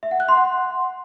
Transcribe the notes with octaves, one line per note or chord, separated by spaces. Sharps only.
E5
F#5
F#6
C6
F#5